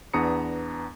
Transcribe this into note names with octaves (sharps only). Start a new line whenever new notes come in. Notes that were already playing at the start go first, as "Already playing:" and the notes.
E2 B3 D4 A#5 D#6 C#7